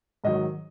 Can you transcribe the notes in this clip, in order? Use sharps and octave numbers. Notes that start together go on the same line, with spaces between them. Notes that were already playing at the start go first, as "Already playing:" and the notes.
G#2 D#3 F#3 D#5